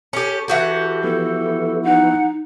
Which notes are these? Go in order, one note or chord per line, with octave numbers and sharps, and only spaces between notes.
C#4 G4 A4
E3 F#4 G4
F3 B3 E4 A4
D#4 F#5